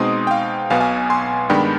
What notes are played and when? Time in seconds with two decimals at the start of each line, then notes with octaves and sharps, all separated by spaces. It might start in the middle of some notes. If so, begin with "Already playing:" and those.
Already playing: B2 G#3 C4 D#4 C6 D#6
0.27 G5
0.31 F5
0.70 B1 B2 B3 F5 G#5
0.80 F5 G#5
1.10 G#5 C6
1.50 G2 D#3 G#3 B3 D4 G5 B5